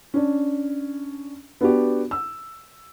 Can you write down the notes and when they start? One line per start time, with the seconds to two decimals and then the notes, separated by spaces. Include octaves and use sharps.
0.14 C#4 D4
1.61 B3 D4 F#4 G4
2.11 E6